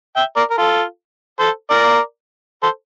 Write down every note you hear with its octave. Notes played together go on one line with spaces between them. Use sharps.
E5 G5
A#4 D5
A#4
F4 A4
A4 C5
A#4 D5
A4 C5